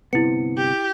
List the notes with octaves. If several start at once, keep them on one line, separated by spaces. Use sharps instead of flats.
G1 C3 B3 E4 C#7
G4